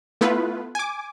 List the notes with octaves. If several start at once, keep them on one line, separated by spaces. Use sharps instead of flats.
A3 B3 E4 F4 B4
G#5 D6